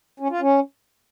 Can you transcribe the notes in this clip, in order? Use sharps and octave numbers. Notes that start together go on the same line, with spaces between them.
C#4
F4
C#4